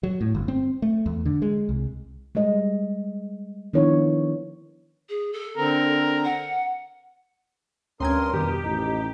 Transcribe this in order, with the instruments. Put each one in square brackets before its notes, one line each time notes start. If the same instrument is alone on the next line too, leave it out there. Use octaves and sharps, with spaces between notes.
[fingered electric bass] F#3
A2
G1
C4
A3
E2
D3
G#3
C2
[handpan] G3 G#3 D#5
D#3 F3 B3 D4 E4 C#5
[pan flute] G#4
A4
[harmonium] D3 C4 [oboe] A#4
[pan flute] F#5
[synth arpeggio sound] D2 C4 G#6 [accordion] G2 A#4 D#6 [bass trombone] C#4 [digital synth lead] C6
[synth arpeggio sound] F2 D#3 [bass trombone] B2 [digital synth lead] G4
[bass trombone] A1 [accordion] D#4